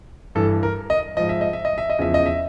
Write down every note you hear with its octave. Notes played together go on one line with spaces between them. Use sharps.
G2 E3 A4
A#4
D#5
G#2 F3 D#5
E5
D#5
E5
D#5
E5
D#5
E2 C#3 F3 E5
D#5
E5